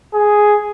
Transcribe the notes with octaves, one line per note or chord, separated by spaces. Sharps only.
G#4